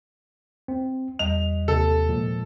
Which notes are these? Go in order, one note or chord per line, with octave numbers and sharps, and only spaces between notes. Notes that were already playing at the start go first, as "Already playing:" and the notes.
C4
E2 G3 D#5 F7
D#2 C3 A4
A#2 F3 G#3